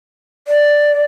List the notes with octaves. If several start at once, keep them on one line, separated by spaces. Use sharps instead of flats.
D5